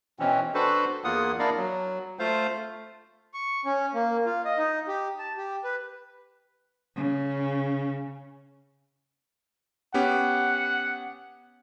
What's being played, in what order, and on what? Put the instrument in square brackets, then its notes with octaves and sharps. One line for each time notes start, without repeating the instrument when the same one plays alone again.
[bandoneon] B2 E3 C4 C#4
D4 F#4 A4 B4 C5
E2 A#3 F4 F#5 D#6
A#3 D4 E4 A#4 D5 F5
F#3
A3 F4 C5 F5
[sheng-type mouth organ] C#6
C#4
A#3
F4
D#5
D#4
G4
A5
G4
B4
[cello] C#3
[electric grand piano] B3 C#4 G4 [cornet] F#5